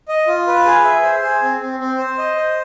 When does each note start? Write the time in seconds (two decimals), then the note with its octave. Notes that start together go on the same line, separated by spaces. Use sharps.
0.08 D#5
0.27 F4
0.47 B4
0.65 G#4
0.85 E5
1.03 C5
1.23 G#4
1.42 C4
1.60 C4
1.79 C4
1.98 C5
2.18 D#5
2.37 C5